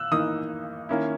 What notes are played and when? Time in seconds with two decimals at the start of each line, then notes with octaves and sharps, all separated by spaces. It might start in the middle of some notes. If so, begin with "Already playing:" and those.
Already playing: E6 F#6
0.12 E3 A#3 D#4 D#6
0.89 D#3 A#3 C#4 E4